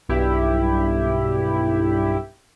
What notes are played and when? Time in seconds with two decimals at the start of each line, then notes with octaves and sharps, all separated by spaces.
0.09 B1 G2 E4 G4